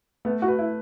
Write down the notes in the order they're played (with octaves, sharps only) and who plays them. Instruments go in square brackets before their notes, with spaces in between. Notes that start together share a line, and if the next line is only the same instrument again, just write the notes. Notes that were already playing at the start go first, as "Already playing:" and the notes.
[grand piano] A3 [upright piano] B3
[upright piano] F#4
[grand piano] B4
[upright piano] E4